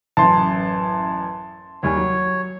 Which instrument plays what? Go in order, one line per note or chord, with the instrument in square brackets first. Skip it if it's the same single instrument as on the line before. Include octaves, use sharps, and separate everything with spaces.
[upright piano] A1 F#2 [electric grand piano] A5 C6
[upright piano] D#2 G3 G#5 [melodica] C#5
[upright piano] F#3